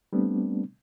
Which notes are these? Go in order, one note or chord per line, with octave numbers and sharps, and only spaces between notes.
G3 A3 B3 C4 D4